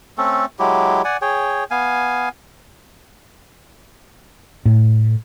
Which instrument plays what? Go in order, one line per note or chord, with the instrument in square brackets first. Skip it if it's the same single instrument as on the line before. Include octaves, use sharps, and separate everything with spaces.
[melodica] A3 C4 C#4 A4
F#3 G#3 E4 G4
D5 F#5 G#5
G#4 C#5 G5
B3 F5 G#5
[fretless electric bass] A2